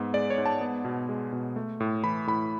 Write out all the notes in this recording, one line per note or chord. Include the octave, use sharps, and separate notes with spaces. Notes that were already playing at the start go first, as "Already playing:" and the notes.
Already playing: G#2 B3
G#3 D5
C#5
G#2
A5
B3
B2
G#3
B2
A3
A2
E3 B5
A2 B5